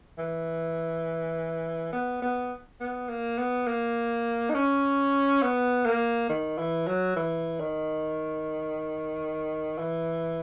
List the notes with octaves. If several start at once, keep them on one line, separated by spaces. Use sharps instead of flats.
E3
B3
B3
B3
A#3
B3
A#3
D#4
C#4
B3
A#3
D#3
E3
F#3
E3
D#3
E3